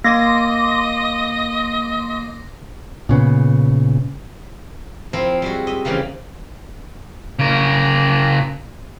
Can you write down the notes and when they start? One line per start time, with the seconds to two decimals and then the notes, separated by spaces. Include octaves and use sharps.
0.04 A#3 D#5 C6 D6 A#6
3.09 A#2 C#3 B3
5.13 F3 C4 E4 A#4
5.42 G3 G#3 F#4
5.67 D#5 E5
5.85 C#3 E3 F3 G3 A#3
7.39 C#3 A#4